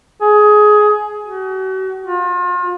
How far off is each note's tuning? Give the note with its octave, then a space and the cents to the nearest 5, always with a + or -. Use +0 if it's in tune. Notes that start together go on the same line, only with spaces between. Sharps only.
G#4 +15
F#4 +40
F4 +35